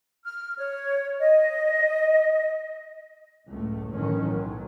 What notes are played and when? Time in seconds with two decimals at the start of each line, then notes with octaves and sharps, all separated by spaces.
0.24 F6
0.57 C#5
1.19 D#5
3.47 F#1 C#2 A2 A3
3.93 G1 A2 D#3 E3 F#3 C#4
4.26 B1 F#3